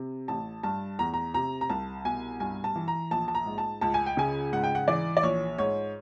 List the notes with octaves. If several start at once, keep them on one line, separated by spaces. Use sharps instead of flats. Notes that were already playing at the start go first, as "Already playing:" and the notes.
Already playing: C3
A1 A5
G2 A5
E2 A#5
A#5
C3 A#5
A#5
C2 A5
B2 G#5
G2 G#5
A5
E3
A#5
A#1 A5
A5
A#5
G#2
A5
C#2 A5
G#5
G5
C#3 G#5
G#2 F#5
G5
F#5
E3 D5
D5
A#1 C#5
G#2 C#5